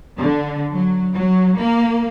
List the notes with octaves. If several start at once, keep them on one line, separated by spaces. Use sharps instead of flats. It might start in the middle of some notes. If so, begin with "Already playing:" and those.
D3
F#3
F#3
A#3